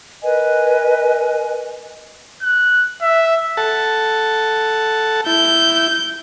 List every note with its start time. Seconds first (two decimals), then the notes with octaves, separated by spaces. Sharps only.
0.23 A#4 B4 D#5 G#5
2.43 F#6
3.02 E5
3.57 A4 F#5 A5
5.26 E4 G6